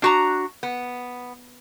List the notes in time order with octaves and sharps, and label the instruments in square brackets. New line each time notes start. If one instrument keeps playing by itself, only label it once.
[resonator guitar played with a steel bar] D4 F#4 A#5
B3